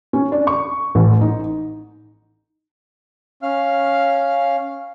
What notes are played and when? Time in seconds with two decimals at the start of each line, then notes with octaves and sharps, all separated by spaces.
0.13 C#4
0.32 D4
0.47 C#6
0.95 A1
1.21 D#4
3.43 C#4 F5 F6